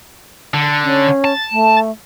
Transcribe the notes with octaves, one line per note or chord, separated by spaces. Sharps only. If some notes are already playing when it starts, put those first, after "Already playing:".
D3
C#4
A5
A3